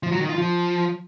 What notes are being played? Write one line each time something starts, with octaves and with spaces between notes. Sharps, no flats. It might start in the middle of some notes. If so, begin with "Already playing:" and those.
F3
F#3
D#3
F4
F3